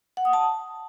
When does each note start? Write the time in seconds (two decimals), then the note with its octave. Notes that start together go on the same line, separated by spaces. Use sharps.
0.17 F#5
0.25 D#6
0.33 A5